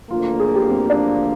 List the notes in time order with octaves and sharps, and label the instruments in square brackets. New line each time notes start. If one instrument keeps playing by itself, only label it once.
[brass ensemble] D2 D3 F3 A#3 [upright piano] F4
[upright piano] G#4
G4
C4
D4